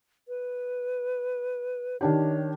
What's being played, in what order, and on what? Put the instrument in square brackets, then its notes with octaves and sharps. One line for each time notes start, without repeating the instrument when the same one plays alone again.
[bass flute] B4
[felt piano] D#3 D4 G4 [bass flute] C#5